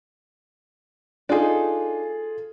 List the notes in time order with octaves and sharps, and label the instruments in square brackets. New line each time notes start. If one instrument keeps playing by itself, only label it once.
[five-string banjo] D4 D#4 [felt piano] F4 G#4 [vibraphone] A4